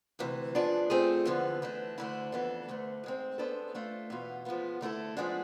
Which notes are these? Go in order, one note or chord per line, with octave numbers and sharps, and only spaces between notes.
D2 C3 E3
F3 B3 D4 G#4 D5
A3 C4 F4 G#4
E2 D3 F3 B3
E3 A3 D4
D2 D3 A3 E4
F2 E3 B3 D4 A4
D2 D3 A3
G#2 G#3 C4
G#3 B3 D4 A4 C5
A3 D4 F4
E2 B2 B3 F4
F3 G#3 B3 F4
D3 A3 C4 E4 A4
F3 G#3 B3 D4 G#4